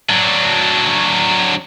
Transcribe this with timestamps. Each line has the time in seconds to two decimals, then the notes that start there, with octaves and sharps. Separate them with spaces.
0.10 F#3 D4